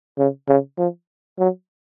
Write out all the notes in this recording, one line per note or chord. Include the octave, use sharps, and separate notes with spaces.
C#3
C#3
F3
F#3